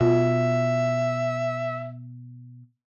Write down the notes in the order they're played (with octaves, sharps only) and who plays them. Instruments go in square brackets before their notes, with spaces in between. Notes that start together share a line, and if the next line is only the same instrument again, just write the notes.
[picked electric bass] B2 [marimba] F4 [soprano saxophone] E5